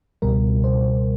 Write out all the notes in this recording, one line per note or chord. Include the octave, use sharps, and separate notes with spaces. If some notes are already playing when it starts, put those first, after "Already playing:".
C#2 B2 G3 A#4
C5